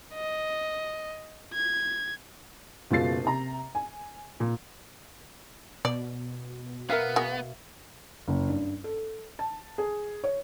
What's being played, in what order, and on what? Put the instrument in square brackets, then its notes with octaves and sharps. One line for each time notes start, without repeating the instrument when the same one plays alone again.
[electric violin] D#5
G#6
[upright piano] F#1 B2 G#3 F4 A6 C7
C3 A#5
G#5
A#2
[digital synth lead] B2 [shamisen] D5
[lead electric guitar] B3 [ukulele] A#4 E5 F5
[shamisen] A#3 F#4 G#4
[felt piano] F#1
G2
A4
A5
G#4
C#5